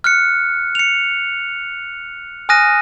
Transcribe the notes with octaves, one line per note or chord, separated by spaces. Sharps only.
F6 F#6 C#7
C#7 F7
G#5 D#6 F6 F#6 A#6 D#7